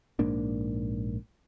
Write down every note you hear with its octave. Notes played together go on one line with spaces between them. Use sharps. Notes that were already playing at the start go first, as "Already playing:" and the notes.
A#1 G#2 A#3 D4